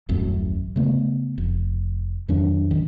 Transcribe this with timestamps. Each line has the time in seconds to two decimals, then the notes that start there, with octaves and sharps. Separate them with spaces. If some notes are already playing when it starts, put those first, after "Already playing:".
0.09 D#1 A1 F#2 A2
0.76 C#3 A3 B3
1.38 F1
2.28 F2 D#3 F#3 D4
2.71 A1 D#3